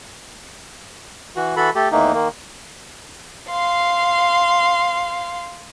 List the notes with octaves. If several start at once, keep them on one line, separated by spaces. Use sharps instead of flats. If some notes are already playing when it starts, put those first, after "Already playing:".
E3 F#4
E3 F#4 A4 B5
A3 G4 A4
E2 D#3 E3 A3 A#3 D#4
D#3 A#3
F5 C6